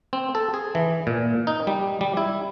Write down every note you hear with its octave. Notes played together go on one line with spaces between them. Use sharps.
C4
A4
G#4
E3
A#2
D#4
G3
G3
E4